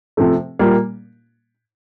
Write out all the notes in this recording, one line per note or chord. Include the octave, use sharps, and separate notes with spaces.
C3 F3 A3
A#2 G3 A#3